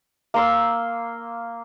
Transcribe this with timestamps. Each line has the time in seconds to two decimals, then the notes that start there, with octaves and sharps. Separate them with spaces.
0.34 A#3 C6 E6